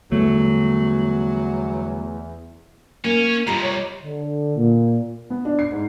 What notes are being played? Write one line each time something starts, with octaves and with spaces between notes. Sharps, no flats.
E2 D3 F#3 G3 A3 B3
A#3 C#4
F2 C3 G3 F4 D#5 A#5
C#5
D3
A#2
B3
D4
C7
G#2